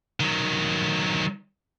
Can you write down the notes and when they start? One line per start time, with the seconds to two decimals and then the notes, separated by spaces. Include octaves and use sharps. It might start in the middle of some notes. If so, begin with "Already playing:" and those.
0.20 D#3 F#3